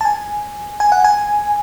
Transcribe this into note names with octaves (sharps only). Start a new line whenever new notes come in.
A5
G#5
G#5
F#5
G#5